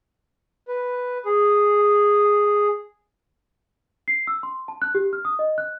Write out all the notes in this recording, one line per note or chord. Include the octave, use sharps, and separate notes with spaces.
B4
G#4
C7
E6
C6
A5
F#6
G4
F6
D#6
D#5
F#6